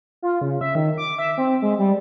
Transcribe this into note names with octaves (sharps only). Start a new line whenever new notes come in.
F4
C#3
E5
D#3
D6
E5
C4
G#3
G3